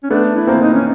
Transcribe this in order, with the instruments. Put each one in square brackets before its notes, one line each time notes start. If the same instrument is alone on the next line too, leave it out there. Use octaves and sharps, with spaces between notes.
[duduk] C#4
[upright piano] A3 B3 [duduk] D4
[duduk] E4
[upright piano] A#3 C4
[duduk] D#4
C#4